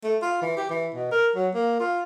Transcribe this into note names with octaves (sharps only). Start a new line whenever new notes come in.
A3
F4
E3
G4
E3
B2
A#4
F#3
A#3
F4